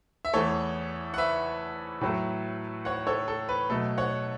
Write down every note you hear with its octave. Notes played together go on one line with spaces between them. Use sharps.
E5
E2 E3 A3 A4 C#5
F#5
B4 E5
A2 F#3 A3
C#5 F#5
A4 C#5
A4
B4
B2 F#3 A3 A4
C#5 F#5